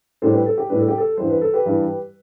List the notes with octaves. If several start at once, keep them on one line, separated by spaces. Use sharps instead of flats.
A2 G3 D4 A4 C5
G4 B4
A4
G4
A2 G3 D4 B4
A4
G4
A4
G2 E3 G3 C5
B4
A4
G4 B4
G2 E3 G3